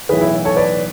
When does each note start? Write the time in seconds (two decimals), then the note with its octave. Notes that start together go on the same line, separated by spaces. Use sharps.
0.09 B1 A2 E3 G#4 B4
0.21 E4
0.45 A4 C#5
0.56 B4 D5